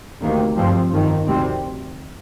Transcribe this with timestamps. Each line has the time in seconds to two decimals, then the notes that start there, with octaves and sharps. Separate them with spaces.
0.21 D2 C3 D#3 A#3
0.56 G2 F3 C4
0.91 G1 F2 D#3
1.27 D2 C3 G3 C4